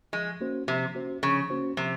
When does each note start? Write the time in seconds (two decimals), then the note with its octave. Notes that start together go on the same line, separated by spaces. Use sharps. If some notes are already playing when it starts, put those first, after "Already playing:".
0.13 F3 G#3
0.41 A#3 C#4 F#4 C5
0.67 C3 F3
0.95 A#3 C#4 F#4 C5
1.23 C#3 F3
1.50 A#3 C#4 F#4 C5
1.77 C3 F3